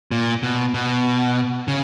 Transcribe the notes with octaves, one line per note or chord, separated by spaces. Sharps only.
A#2
B2
B2
C#3